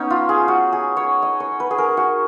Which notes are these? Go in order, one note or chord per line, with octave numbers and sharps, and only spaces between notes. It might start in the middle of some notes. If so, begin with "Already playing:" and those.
Already playing: B3 C#4 D#4
F4
G#4
F#4
G#4
C#5
D#5
C#5
B4
G#4
A#4
F#4